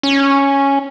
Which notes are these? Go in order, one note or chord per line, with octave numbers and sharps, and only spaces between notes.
C#4